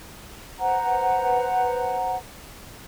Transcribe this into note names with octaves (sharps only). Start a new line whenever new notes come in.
B4 C5 F#5 A#5